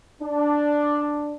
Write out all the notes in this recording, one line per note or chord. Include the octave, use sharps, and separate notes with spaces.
D4